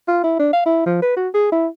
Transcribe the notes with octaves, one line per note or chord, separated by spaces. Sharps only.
F4
E4
D4
F5
E4
F3
B4
F#4
G#4
E4